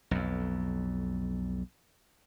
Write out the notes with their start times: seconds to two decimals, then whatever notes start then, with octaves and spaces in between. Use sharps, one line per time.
0.11 B1 F2